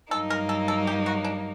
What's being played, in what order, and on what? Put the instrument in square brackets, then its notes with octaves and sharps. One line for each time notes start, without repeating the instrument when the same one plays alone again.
[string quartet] G2 F#3 A#3 D#4 [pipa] A4
[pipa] A#4
A4
A4
G4
F#4
D4